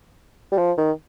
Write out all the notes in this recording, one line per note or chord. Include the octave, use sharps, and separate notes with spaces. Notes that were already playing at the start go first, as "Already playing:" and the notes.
G3
F3
D#3